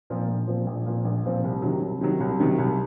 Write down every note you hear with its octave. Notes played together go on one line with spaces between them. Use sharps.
A#2 F3 C4
A#1
A#2 F3 C4
A#1
A#2 F3 C4
A#1
A#2 F3 C4
C2
C3 D#3 F#3
C2
C3 D#3 F#3
C2
C3 D#3 F#3
C2